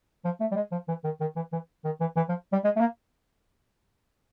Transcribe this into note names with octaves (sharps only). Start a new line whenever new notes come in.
F3
A3
G3
G#3
F3
E3
D#3
D#3
E3
E3
D#3
E3
E3
F3
G3
G#3
A3
A#3